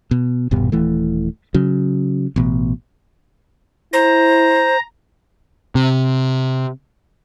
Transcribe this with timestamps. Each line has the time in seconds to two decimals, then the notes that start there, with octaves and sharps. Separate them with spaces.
0.11 B2
0.51 D#1 G2 B2 G3
0.72 D#1 E3 A3
1.54 C#3 F#3
2.36 A1 B2
3.93 E4 C5 A#5
5.75 C3